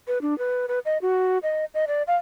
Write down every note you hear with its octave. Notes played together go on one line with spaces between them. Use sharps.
B4
D4
B4
B4
D#5
F#4
D#5
D#5
D5
F5